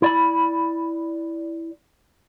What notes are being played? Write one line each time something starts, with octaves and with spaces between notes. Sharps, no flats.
E4 D5 B5